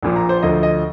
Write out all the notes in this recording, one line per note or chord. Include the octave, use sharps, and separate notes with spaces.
A#1 A#2 F3
A#5
C5
D2 D3 F3 D#5
D#5